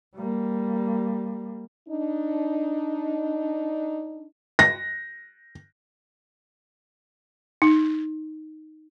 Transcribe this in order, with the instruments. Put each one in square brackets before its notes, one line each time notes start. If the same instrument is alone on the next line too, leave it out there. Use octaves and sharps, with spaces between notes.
[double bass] G3 A#3
[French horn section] D4 D#4
[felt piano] A#6
[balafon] D#4